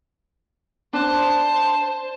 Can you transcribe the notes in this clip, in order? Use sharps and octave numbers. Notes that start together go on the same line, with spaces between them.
D4 C5 A5